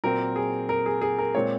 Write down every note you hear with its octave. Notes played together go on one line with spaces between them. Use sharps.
A#2 F#3 C4 A#4
G#4
A#4
G#4
G#4
A#4
A#2 G#3 C4 C#5